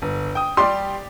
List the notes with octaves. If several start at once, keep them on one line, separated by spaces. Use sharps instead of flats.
G1
G5 D#6
G3 G4 D5 C6